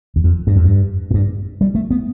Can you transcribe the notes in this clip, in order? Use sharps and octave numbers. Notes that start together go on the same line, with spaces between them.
E2
F2
G2
F2
G2
A2
G2
G3
A3
B3